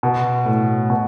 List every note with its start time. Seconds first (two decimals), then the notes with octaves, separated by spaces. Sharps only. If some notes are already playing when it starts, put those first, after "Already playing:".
0.03 B2
0.45 A2
0.90 B2